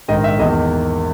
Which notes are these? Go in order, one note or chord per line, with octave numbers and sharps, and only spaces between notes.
A#1 G#2 D#3 D#5
E5
E2 D#3 A#3 D#5